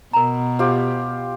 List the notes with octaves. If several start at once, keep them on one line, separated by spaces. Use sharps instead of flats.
B2 A#4 A#5
F4 G4 C5